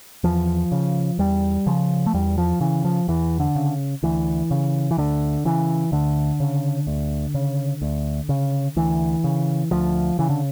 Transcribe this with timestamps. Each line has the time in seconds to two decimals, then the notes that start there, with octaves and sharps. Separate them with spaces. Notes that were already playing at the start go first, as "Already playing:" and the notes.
0.24 E2 F3
0.72 C#3
1.19 E2 G3
1.66 C#3 F3
2.06 A3
2.14 E2 G3
2.38 F3
2.61 C#3 E3
2.85 F3
3.08 E2 E3
3.40 D3
3.56 C#3
4.03 D2 E3
4.51 C#3
4.91 E3
4.98 D2 D3
5.45 C#3 E3
5.92 D2 D3
6.40 C#3
6.87 D2
7.34 C#3
7.82 D2
8.29 C#3
8.76 D2 E3
9.24 C#3
9.71 D2 F3
10.19 C#3 E3
10.30 D3